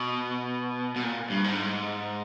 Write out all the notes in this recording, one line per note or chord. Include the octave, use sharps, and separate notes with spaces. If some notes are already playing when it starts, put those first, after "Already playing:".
Already playing: B2
B2
A#2
G2
G#2